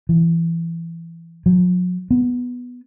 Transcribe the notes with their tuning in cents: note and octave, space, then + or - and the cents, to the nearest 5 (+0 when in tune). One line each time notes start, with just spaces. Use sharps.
E3 +20
F#3 -45
B3 +0